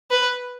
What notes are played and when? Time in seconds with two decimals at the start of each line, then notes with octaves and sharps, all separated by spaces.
0.11 B4